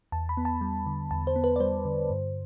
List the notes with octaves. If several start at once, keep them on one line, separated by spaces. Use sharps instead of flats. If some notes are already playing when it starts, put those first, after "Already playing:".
E2 A5
B5
B3
A5
G3
D3
E2 A5
C5
B3
B4
D5
G3 C5
D3
G2